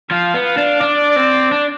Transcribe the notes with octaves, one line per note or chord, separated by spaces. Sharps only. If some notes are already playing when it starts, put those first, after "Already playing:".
F3 F5
B3
F5
D4
D4 D5
C4
D4